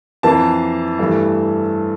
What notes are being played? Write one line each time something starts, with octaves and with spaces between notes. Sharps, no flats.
F2 E3 A#3 A5
G2 E3 A3